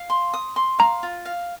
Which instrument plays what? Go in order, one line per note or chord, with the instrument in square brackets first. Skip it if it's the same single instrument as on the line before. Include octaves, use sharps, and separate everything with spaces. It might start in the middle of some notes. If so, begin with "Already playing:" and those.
Already playing: [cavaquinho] F5
C6
D#6
C6
[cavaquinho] F5 [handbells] A#5
[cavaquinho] F4
F5